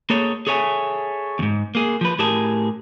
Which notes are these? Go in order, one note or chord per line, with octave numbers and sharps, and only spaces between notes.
A#3 G#4 A4 C#5
G#4 A4 C#5 E5 G#5
D#2 G#2
A#3 G#4
F3 B4
A2 G4 G#4 A#4 A5